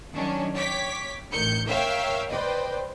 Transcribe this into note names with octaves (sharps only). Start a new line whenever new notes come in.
D#3 F#3 C#4 D4
C#5 G5 D6 B6
A1 D#3 G6 C#7
A#4 C#5 E5 F5 G5
B4 C5 D5 D#5 G5